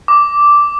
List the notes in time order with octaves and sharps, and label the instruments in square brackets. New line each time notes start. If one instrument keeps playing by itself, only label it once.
[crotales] D6